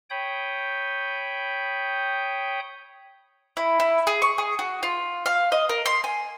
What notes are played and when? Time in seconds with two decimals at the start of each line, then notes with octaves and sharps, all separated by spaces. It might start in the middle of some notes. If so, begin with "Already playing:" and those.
0.10 C#5 G5 B5 D#6 G6
3.57 E4
3.80 E4
4.07 G#4
4.22 C#6
4.38 G#4
4.59 F#4
4.83 F4
5.26 F5
5.52 D#5
5.69 A#4
5.86 C6
6.04 G#5